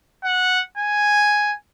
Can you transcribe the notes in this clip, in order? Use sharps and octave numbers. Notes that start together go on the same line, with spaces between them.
F#5
G#5